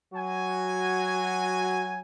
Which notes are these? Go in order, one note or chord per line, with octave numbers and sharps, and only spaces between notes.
F#3 F#4 G#5